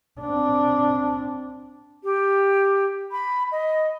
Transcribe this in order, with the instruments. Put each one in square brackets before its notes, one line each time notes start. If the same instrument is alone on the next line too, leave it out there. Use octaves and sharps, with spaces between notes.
[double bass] C4 D4
[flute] G4
B5
D#5